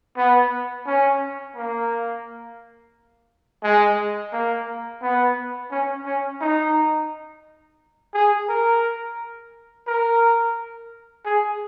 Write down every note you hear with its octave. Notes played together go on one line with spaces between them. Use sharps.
B3
C#4
A#3
G#3
A#3
B3
C#4
C#4
D#4
G#4
A#4
A#4
G#4